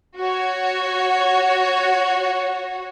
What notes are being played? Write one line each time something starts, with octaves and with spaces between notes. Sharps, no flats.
F#4 C#5